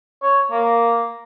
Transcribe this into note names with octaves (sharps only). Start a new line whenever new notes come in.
C#5
A#3